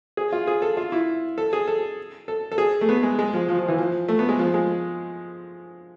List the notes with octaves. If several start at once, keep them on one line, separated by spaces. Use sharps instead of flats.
G#4
F4
G#4
A4
F4
E4
A4
G#4
A4
A4
A4
G#4
A3
B3
G#3
G#3
F3
F3
F3
E3
F3
A3
B3
G#3
F3
G#3